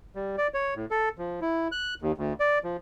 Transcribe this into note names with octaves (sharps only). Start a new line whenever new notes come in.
G3
D5
C#5
A2
A4
F3
E4
F#6
D#2
D2
D5
F3